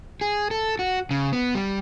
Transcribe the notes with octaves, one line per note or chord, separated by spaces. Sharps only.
G#4
A4
F#4
C#3
B3
G3